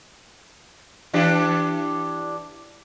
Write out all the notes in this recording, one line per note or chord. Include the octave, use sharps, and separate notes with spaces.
E3 D4 G4